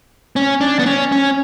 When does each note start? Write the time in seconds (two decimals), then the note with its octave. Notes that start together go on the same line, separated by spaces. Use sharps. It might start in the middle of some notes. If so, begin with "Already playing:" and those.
0.36 C#4
0.61 D4
0.79 B3
0.86 C#4
1.12 C#4